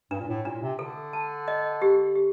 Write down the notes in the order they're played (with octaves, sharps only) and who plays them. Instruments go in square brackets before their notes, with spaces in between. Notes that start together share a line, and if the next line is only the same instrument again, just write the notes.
[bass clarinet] G2 [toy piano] D4
[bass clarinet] A#2
A2
[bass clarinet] A#2 [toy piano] D4
[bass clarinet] C3
[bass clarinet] D3 [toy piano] A4
[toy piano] A5
D#5
G4
G4